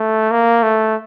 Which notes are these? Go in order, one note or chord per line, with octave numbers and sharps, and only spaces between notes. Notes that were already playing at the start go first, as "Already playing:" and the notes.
Already playing: A3
A#3
A3